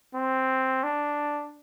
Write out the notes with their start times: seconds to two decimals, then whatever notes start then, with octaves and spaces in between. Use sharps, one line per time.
0.15 C4
0.83 D4